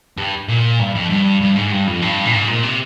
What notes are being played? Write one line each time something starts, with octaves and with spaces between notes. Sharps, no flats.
G2
A#2
G2
F2
G2
G2
G#2
G2
F2
G2
A#2
G#2
A#2
C3